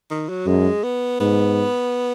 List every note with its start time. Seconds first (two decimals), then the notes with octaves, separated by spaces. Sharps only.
0.10 D#3
0.29 F#3
0.47 F#2 G#3
0.83 B3
1.20 G#2 B3